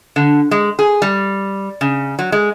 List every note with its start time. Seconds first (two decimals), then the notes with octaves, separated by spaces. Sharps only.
0.16 D3
0.51 G#3
0.79 G#4
1.02 G3
1.81 C#3
2.19 F#3
2.32 G#3